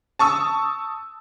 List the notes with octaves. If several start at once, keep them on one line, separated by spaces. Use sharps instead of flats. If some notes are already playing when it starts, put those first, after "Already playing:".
A5 C#6 D#6 E6